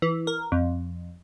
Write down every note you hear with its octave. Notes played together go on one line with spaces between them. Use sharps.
E3
A#4
F2